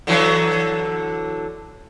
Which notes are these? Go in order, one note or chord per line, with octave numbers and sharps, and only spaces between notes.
D3 E3 F#3